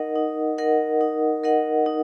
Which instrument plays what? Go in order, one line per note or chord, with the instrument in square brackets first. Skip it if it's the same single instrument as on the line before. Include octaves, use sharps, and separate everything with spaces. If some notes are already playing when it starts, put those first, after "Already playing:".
Already playing: [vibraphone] D#4 A#4 D#5 F#5
D#4
A#4 D#5 F#5
D#4
A#4 D#5 F#5
D#4